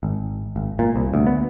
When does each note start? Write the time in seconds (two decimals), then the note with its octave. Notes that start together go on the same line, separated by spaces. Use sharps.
0.03 G#1
0.56 G#1
0.79 A#2
0.96 C2
1.14 D2
1.27 B3